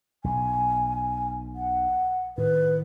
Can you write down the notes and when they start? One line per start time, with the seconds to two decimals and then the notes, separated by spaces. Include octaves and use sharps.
0.24 B1 G#5
1.56 F#5
2.38 A2 D#3 B4